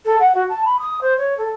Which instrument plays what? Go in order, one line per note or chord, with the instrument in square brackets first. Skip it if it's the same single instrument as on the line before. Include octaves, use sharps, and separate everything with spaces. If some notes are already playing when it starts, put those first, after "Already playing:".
[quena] A4
F#5
F#4
A5
B5
D#6
C5
C#5
A4